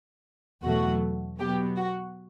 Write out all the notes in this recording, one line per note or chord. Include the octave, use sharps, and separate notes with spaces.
E2 B2 F#3 A3 F#4
B2 F#3 B3 G4
F#4